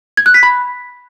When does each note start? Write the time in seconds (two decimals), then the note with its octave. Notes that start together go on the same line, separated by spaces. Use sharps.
0.17 G#6
0.26 F#6
0.34 B6
0.43 B5